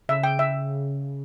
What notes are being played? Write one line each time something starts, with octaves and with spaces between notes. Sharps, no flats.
C#3 E5
G5
E5